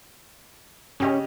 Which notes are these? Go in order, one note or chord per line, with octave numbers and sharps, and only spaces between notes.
C#3 C#4 G4 D#5